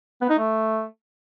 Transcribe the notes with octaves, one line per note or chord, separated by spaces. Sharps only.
B3
D#4
A3